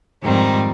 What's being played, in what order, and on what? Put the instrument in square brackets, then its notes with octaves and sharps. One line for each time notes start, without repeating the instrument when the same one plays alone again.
[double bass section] F2 [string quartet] G#2 D#3 G3 C4 D#4